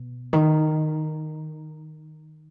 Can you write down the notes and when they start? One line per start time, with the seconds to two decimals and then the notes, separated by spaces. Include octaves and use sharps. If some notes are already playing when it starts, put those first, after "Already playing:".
Already playing: B2
0.33 D#3